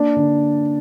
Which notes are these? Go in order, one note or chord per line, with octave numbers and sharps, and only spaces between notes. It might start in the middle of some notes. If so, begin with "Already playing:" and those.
Already playing: A#3 D4 D5
D3